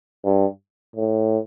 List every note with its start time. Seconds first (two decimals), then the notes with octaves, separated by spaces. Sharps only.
0.24 G2
0.96 A2